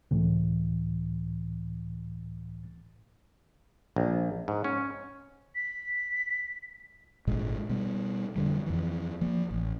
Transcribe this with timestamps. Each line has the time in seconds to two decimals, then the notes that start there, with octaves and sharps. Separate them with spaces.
0.11 C#2 A2 E3
3.96 A#1
4.48 G#2
4.64 C#4
5.55 B6
7.27 G#1 A#2 G#3
7.69 B2 G3
8.36 F2 D3 G3
8.66 F2 E3
9.21 F3 A#3
9.51 A1